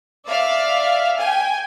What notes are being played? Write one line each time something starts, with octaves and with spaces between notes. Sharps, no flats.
D5 E5 F5
G5 G#5